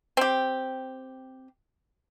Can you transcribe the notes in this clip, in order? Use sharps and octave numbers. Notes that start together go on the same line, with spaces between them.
C4 G4